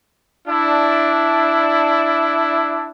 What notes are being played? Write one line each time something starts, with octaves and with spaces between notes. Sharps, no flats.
D4 E4